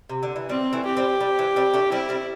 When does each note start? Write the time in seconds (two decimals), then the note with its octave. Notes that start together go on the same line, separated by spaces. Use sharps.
0.10 C3
0.23 D3
0.36 E3
0.49 G3 C4
0.73 E3 A3
0.86 G4
0.97 G3 C4
1.21 G3
1.39 E3
1.56 G3 C4
1.74 A3 D4
1.91 G3 C4 E4
2.09 G3 C4